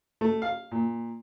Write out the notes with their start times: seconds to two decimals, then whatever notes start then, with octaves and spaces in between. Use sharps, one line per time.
0.21 A3
0.42 F5
0.71 A#2